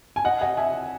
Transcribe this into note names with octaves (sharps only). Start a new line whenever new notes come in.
G#5
D#5 F#5
D#5 F#5
E5 G#5